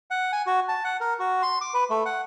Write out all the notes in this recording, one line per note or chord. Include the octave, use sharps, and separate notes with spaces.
F#5
G#5
F#4
A5
F#5
A#4
F#4
C6
D6
B4
A3
F#5